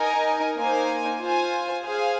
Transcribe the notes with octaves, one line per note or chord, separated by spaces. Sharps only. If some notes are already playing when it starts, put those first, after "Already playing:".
Already playing: D#4 A#4 D#5 G#5
A#3 D#4 C5 G#5
F4 C5 G#5
G#4 C5 F5 G#5